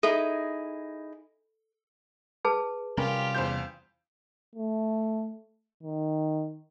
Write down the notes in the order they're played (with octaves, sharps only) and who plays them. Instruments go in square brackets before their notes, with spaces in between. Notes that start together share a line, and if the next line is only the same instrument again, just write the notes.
[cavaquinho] D#4 E4 G#4 [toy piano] A4
[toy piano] G#4 B4 A5
[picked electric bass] C3 G3 C#4 [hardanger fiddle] F4 G4 [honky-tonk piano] A#4
[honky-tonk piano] E2 C5 G6
[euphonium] A3
D#3